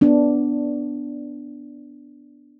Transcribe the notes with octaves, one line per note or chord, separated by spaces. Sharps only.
B3 D4